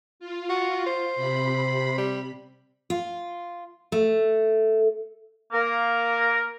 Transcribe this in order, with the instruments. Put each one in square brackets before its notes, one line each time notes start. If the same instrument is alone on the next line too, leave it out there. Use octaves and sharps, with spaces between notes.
[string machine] F4
[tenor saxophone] F#4
C5
[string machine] C3 B5
[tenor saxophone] G3
[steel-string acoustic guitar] F4
A3
[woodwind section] A#3 A#4